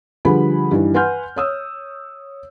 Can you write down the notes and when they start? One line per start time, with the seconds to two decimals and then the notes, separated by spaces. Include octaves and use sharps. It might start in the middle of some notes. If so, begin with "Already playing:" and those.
0.25 D3 F3 G3 G#4 B4 B5
0.71 G2 D#3 E3
0.94 B4 F#5 G#5 C6 F6 G6
1.36 C#5 D#6 E6